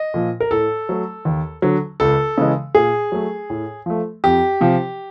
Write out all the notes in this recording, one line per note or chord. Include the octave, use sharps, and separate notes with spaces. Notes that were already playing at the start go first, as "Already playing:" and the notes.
Already playing: D#5
A#2 F3
A#4
A2 A4
F#3 A3
D#2
D3 F#3
C#2 A4
C#3 E3 G#3
A#2 G#4
F#3 A3
A2
F3 A3
F2 G4
C3 F3